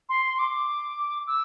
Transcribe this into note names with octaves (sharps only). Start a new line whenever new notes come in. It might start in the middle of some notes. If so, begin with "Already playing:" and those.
C6
D6
E6